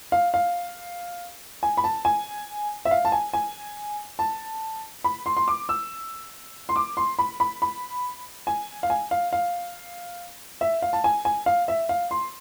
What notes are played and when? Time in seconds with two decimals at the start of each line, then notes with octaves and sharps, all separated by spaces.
0.12 F5
0.34 F5
1.63 G#5
1.77 B5
1.84 A5
2.05 G#5
2.85 E5
2.91 F5
3.05 A5
3.12 G#5
3.33 G#5
4.19 A5
5.04 B5
5.26 C6
5.37 C6
5.48 D6
5.69 E6
6.69 C6
6.76 D6
6.97 C6
7.19 B5
7.40 B5
7.62 B5
8.47 G#5
8.83 F5
8.90 G#5
9.11 F5
9.33 F5
10.61 E5
10.82 F5
10.93 A5
11.04 G#5
11.25 G#5
11.46 F5
11.68 E5
11.89 F5
12.11 C6